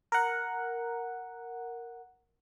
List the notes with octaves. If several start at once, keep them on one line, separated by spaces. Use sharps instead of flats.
A#4 F#5